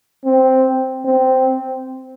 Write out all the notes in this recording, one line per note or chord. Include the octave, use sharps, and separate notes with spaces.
C4
C4